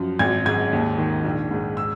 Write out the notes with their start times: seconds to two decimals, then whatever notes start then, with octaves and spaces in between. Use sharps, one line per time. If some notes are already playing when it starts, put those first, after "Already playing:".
Already playing: F#2 F3
0.19 G#1 G#6
0.45 G#2 G#6
0.73 D#2
0.98 D#3
1.24 A#1
1.51 G#2
1.77 E6